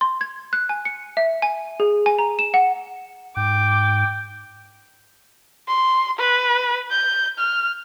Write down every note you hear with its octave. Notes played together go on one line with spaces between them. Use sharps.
C6
G#6
F#6
G#5
C#7
E5
G#5
G#4
G#5
A#5
E7
F#5
G#2 G5 D6
C6
B4
G6
F6